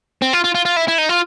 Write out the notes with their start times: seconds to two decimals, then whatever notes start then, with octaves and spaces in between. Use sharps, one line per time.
0.22 C4
0.33 F4
0.44 F4
0.55 F4
0.65 F4
0.76 E4
0.88 E4
0.98 D#4
1.09 F4